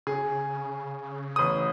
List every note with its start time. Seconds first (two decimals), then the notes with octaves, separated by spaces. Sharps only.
0.07 C#3 G#4
1.36 A1 D#6